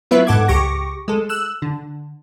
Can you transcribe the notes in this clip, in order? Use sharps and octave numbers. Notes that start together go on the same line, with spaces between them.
F#3 B3 E4 F4 B4 E5
G#2 A4 F#5 D6 G#6
C#2 G4 C#6 D6 A#6
G#3 A4
E6 F#6 E7
D3